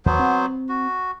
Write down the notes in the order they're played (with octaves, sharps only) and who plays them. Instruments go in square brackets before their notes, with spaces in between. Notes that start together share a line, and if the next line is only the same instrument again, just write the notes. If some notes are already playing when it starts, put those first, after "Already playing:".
[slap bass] D#2 [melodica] F#3 B3 C5
[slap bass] C4
[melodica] F#4